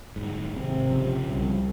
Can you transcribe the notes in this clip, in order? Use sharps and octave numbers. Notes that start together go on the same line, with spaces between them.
D1 G1 G#2
G#1 C3 C4
C#3 F3
C2